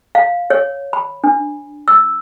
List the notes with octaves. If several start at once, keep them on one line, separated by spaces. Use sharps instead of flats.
F5
C#5
B5
D4
E6